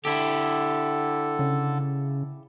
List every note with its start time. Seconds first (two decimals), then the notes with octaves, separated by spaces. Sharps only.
0.05 D3 E4 G4 A4
1.39 C#3